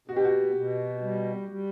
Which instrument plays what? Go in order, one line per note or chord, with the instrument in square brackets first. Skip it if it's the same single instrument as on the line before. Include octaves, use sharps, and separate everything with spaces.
[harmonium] B2 [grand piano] F#4
[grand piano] G4
F#4
[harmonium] B2
G3
G3